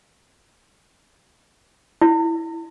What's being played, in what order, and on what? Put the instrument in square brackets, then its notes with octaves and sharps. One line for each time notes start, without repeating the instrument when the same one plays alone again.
[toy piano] E4